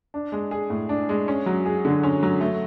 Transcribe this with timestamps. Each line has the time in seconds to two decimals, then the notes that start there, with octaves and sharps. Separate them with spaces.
0.14 D4
0.32 G#3
0.51 G#4
0.70 A2
0.89 D4
1.09 G#3
1.28 C#4
1.46 F#3
1.66 G#4
1.85 D3
2.03 C#4
2.23 F#3
2.41 A3